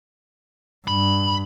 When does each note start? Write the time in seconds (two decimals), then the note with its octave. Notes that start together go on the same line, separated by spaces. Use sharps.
0.88 G2 B5